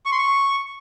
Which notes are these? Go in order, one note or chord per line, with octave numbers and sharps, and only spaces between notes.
C#6
C6
C#6